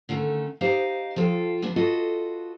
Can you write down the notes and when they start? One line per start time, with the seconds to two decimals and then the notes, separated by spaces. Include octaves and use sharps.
0.09 D3 D#3 A3 B3 C#4
0.61 D#4 G4 C5 D#5 F5
1.16 F3 F4 A4 F5 G5
1.62 D2 F3 B3 D4
1.76 F4 F#4 A4 B4 D#5